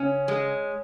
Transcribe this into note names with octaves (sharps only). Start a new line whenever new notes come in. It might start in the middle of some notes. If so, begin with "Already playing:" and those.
Already playing: C#3 C#4
G#3